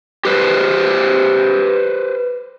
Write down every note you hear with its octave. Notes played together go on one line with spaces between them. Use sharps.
G4 B4 C5